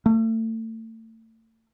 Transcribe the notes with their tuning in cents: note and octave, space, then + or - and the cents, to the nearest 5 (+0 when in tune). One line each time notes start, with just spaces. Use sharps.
A3 +35